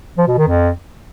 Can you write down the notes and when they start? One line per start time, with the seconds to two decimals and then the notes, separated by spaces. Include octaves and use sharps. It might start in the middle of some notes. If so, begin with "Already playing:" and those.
0.18 F3
0.28 B2
0.38 D#3
0.48 F2